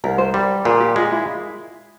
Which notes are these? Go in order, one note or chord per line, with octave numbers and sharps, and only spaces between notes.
C2 A#4
C5
G3
A#2 G#4
G4
G#3 F4
E4